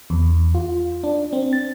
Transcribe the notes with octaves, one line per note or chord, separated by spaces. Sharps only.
E2
F4
D4
C4
A6